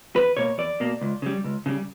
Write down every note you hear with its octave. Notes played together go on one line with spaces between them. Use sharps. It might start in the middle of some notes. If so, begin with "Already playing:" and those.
E2 B4
B2 A#3 C#5
E2 D5
B2 A#3
C#2
C#3 G3
C#2
C#3 G3